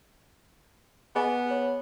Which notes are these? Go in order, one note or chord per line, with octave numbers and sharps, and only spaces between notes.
B3 G#4 D#5 G#5
C#5